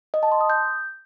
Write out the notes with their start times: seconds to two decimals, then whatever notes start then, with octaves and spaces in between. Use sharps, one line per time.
0.14 D#5
0.23 A5
0.32 C6
0.41 D#6
0.50 G6